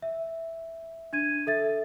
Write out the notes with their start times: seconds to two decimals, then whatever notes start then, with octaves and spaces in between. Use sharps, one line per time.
0.02 E5
1.13 D4 G#6 D#7
1.47 A4 E5 A6